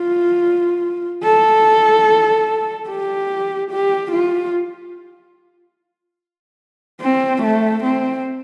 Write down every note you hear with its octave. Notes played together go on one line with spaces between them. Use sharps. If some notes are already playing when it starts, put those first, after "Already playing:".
Already playing: F4
A4
G4
G4
F4
C4
A3
C4